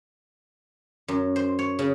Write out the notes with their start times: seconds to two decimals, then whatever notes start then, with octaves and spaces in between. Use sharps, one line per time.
1.08 F#2
1.36 C5
1.59 C#5
1.79 C#3